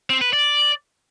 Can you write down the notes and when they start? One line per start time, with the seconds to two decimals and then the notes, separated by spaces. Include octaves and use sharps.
0.10 C4
0.21 B4
0.33 D5